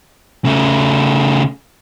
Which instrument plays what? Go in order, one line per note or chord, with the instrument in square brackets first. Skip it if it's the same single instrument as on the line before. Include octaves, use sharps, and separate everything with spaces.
[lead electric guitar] C#3 A3